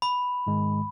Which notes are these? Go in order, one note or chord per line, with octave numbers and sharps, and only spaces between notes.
B5
G#2 D#3 G#3